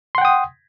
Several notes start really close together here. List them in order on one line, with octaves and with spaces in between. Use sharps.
C6 F#5 G5 D#6